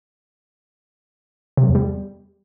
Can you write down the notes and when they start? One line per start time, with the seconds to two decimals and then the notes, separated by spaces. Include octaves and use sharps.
1.57 C3
1.63 F#3
1.69 E2
1.75 G3